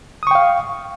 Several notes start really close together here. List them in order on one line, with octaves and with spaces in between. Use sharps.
D#6 C#6 G5 F5